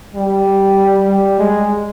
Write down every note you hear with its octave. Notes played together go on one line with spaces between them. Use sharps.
G3
G3
G#3